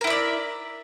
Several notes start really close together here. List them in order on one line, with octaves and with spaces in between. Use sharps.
A#4 E4 E5 D5